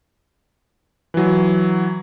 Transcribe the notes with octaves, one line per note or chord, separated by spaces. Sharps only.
E3 F#3